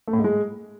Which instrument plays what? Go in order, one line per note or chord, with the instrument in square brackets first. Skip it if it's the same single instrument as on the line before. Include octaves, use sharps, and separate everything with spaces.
[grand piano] A3
A2
G#2
G#3